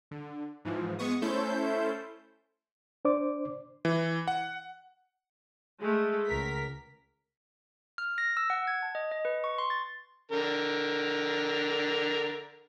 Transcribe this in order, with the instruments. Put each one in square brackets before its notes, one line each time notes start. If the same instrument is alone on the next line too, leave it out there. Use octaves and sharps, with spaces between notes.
[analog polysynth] D3
G#2 E3 F3
G#3 B3 C#6 D#6
A3 C#4 E4 A4 C5 G6
[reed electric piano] D4 C5 D5 D6
[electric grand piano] E3
F#5
[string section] G#3 A3
C#2 A#4 B6
[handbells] F6
A#6
E6
F#5
G#6
A5
D#5
D#5
B4
C#6
C6
A6
[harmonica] D3 A#4